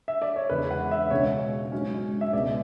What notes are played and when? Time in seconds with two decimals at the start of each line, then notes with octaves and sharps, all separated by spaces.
0.08 E5
0.22 D5
0.36 C#5
0.50 E2 C#3 G#3 B4
0.71 F#5
0.91 E5
1.11 C#2 B2 G#3 C#4 C#5
1.72 G#2 F#3 C#4
2.21 E5
2.33 C#2 B2 G#3 B3 D5